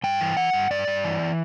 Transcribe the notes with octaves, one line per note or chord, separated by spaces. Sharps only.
G2 G5
E3
E3 F#5
G2
G2 D5
G2
E3